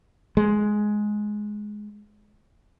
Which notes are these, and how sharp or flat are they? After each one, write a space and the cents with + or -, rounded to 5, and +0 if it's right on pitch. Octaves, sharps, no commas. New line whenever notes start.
G#3 +10